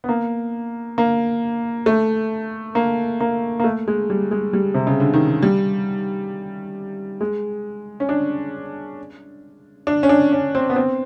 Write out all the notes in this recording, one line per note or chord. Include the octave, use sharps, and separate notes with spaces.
B3
A#3
A#3
A3
A#3
A#3
A#3
A3
G#3
G3
G#3
G3
C3
C#3
D3
D#3
G3
G#3
C#4
D4
D4
C#4
D4
C#4
C4
B3
C4